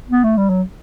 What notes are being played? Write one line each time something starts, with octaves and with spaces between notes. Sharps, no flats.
B3
A3
G3
F#3